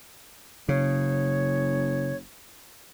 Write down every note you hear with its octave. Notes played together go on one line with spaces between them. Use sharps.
F#1 C#3 C#5